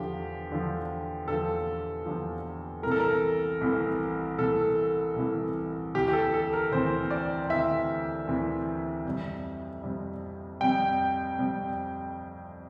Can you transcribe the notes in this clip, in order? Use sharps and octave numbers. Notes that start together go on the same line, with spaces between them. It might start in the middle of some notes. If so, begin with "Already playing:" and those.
Already playing: E2 D3 F3 G4
E2 D3 F3
E2 D3 F3 A4
E2 D3 F3
C2 C3 E3 A3 A#4
A4
A#4
C2 C3 E3 A3
C2 C3 E3 A3 A4
C2 C3 E3 A3
D2 C3 E3 G4
G4
A4
A4
A#4
D2 C3 E3 C5
D5
D2 C3 E3 E5
D2 C3 E3
F2 C3 G3
F2 C3 G3
F2 C3 G3 G5
F2 C3 G3